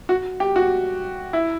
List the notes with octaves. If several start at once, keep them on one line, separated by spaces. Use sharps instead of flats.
F#4
G4
F#4
E4